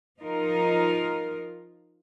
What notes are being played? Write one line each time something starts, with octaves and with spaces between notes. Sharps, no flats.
F3 D#4 F4 A#4